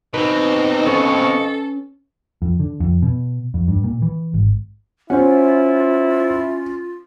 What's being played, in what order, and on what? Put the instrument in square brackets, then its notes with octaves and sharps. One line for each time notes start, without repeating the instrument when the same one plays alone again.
[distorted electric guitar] B2 C4 [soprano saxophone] D#4 [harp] B4
[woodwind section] F2 D#5 C#6 [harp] C#4 [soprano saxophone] A4
[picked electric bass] F2
D3
F2
B2
F2
G2
A#2
E3
G#1
[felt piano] C#4 [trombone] E4 [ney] F4 [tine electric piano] C5 F#5